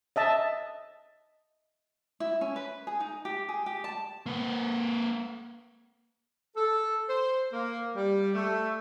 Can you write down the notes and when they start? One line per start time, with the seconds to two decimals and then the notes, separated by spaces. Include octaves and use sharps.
0.16 D#5 E5 A5
2.20 E4
2.41 C#4
2.56 B4
2.87 G#4
3.00 D#4
3.25 G4
3.49 G#4
3.66 G4
3.84 A5
4.26 A#3 B4
6.56 A4
7.09 C5
7.52 A#3
7.96 G3
8.35 A3